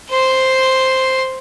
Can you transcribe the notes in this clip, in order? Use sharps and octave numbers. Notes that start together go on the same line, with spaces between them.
C5 C6